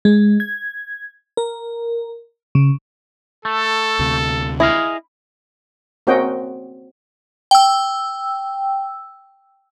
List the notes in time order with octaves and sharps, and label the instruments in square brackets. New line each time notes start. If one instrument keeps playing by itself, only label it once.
[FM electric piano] G#3
G#6
A#4
C#3
[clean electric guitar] A3 [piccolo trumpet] A4
[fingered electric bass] D2 C3
[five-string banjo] E4 [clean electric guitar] G#4 D#5 F5
[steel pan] A#3 C4 C#4 F#4 D#5 G5
[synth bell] G5 E6